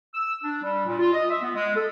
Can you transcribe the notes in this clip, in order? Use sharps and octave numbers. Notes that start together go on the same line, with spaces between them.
E6
D4
G3
A#2
F4
D#5
E5
B3
G#3
A4